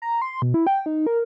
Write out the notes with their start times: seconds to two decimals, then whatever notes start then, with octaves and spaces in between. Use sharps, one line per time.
0.02 A#5
0.22 C6
0.42 B2
0.54 E4
0.67 G5
0.86 D#4
1.07 A#4